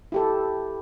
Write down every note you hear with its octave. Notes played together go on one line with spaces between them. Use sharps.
E4 G4 A4